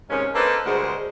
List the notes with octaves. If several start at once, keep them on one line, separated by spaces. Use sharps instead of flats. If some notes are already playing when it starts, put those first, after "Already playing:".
G#2 C3 D#3 C#4
A#3 D4 D#4 A4 B4 C5
D2 G2 G#3 A#4 C5 F#5